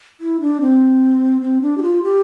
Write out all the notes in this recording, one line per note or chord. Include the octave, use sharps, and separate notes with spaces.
E4
D4
C4
C4
D4
G4
F4
G4